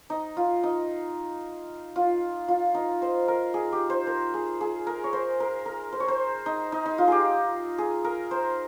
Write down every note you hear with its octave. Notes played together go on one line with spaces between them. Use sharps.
D#4
F4
D#4
F4
F4
D#4
C5
A#4
G#4
G4
C5
A#4
G#4
G#4
A#4
C#5
C5
A#4
A#4
C5
C#5
C5
D#4
D#4
D#4
F4
G4 G#4
G#4
A#4
C5